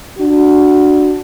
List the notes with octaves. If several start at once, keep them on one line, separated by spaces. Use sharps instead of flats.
D4 F#4